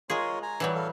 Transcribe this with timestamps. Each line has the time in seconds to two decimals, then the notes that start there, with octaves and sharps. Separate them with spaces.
0.10 G#3 F4 G#4 A#4 C#5
0.43 G#5 A#5
0.60 E3 F#3 G3
0.75 A4 F5